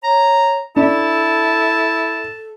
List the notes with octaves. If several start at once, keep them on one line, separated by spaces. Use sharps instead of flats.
C#5 A#5
D4 E4 A4 A5